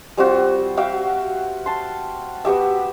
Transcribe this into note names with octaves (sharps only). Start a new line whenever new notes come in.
G3 C4 F4 F#4
F#4 E5 F5 G5
A5 C6
B3 F#4 G4 E5